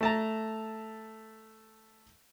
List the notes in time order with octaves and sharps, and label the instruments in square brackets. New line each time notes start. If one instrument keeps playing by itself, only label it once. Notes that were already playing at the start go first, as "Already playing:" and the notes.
[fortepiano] A3 A5 A#5